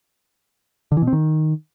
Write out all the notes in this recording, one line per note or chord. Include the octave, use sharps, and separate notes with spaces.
D3
E3
B2
C4
D#3